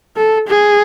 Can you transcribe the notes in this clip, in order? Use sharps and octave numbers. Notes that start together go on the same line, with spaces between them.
A4
G#4